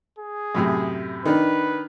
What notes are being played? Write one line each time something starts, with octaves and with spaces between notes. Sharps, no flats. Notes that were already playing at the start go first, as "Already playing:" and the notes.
G#4
F#2 A2 C3
D#3 D4 B4